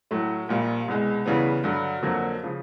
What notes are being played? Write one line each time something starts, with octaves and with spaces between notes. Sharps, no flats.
A2 F#3 A3
A#1 A#2 G3
C2 B2 G#3
E2 C#3 E3 G3 B3
G2 D3 F#3
F2 D3 F#3 A#3
C#3 F3